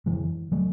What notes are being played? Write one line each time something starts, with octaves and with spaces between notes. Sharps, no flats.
F#2 D3 E3 G#3
F#3 A3